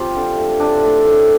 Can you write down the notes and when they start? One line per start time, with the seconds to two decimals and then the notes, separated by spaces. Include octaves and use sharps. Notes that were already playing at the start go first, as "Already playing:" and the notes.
Already playing: F3 C4 F4 G4
0.15 D3
0.36 A3
0.59 A2 D4
0.83 A3
1.05 A2